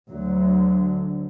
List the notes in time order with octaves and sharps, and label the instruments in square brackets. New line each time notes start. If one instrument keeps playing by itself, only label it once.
[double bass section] D2 D3 F#3